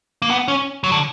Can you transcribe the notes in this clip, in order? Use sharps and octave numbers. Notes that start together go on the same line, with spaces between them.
A#3
B3
C#4
F#3
D3